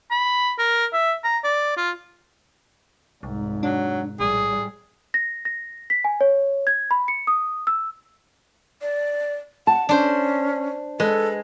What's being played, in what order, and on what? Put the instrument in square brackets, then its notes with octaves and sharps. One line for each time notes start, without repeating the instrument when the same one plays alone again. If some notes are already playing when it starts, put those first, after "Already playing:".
[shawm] B5
A#4
E5
A#5
D5
F4
[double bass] F1 G#2 [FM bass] C2
[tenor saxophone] F#3 [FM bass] D4
[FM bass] A#1 [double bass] A2 G3 [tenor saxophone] G#4
[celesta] A#6
A#6
B6
G#5
C#5
G#6
B5
C#7
D#6
E6
[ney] D5
[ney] F#5 [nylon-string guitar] A5
[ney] C#4 [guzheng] D4 C5
[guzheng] G#3 [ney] A4 [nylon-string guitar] B4